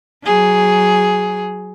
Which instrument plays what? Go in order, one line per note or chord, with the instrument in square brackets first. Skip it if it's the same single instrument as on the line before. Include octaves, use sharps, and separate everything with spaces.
[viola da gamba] F#3 G#4